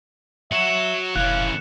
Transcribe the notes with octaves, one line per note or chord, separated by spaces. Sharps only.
F#4 C#5 E5 C#7 E7
F1 E3 C#4 F5 F#6